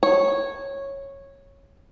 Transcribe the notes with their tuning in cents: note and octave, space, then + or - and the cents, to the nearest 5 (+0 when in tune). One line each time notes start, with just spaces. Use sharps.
C#5 -10